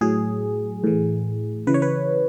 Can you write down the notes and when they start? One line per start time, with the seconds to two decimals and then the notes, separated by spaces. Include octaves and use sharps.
0.01 A2 F#3 G#4
0.84 A2 E3
1.67 C#3 E3 B4
1.74 C#5
1.82 B4